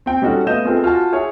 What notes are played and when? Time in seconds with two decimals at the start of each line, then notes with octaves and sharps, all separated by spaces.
0.06 C4 G5
0.22 G3 C#4 D#4 F#4 A4
0.47 A3 B3 D#5 F5 G6 E7
0.65 C4 F4 G#4 A4 B4
0.84 F4 F#4 G#5 A5
1.12 E4 G#4 C#5